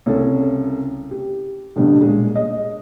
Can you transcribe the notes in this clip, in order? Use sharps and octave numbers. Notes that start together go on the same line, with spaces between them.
C2 C#3 A4 C#5
G4
A1 D2 B2 D3 G3
A#2 G#3
D#5